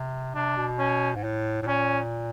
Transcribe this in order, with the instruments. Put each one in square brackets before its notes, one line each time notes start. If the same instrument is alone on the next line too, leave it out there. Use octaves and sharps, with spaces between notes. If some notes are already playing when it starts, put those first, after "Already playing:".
Already playing: [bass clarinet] C3
[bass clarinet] C3 [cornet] D4
[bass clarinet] B2
[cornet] C#4
[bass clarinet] G#2
A2
A2
[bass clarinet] A#2 [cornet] C#4